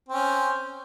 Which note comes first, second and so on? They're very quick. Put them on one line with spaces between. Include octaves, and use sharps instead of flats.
C4 C#4 C5